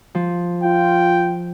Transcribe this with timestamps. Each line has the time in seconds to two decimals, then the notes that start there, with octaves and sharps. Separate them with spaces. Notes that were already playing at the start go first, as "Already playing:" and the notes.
0.15 F3
0.63 F4 G5